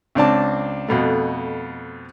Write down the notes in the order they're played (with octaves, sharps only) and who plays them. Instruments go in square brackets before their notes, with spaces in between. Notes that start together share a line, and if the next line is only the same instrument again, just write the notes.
[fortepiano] C#2 C4 D4 A5
F2 B2 A3